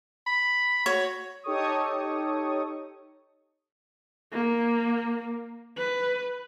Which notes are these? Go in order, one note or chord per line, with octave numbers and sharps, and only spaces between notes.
B5
F#4 C#5
D#4 G4 A4 C#5 C#6 D#6
A#3
B4